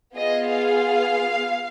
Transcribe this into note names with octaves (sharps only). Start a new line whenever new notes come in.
B3 F4 G#4 D#5
F5